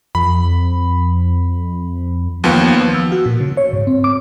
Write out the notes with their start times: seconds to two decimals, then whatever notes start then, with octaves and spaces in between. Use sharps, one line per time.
0.15 F2 B5
2.44 D#2 F3 B3
2.94 E6
3.12 F#4
3.26 A#2
3.40 C#3
3.57 C#5
3.73 G#2
3.87 C4
4.04 D6